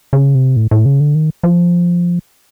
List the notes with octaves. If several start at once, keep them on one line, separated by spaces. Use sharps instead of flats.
C#3
C3
A2
A2
C#3
D3
D#3
F3